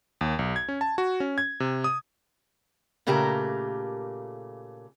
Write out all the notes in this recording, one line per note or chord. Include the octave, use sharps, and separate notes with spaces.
D#2
B1
G#6
C#4
A5
F#4
C#4
G#6
C3
D#6
A#2 C#3 A3 G4 A#4 A#5